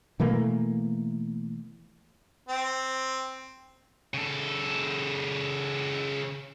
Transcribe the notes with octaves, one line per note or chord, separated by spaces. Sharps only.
B2 E3 A3 A#3
C4
C#3 A4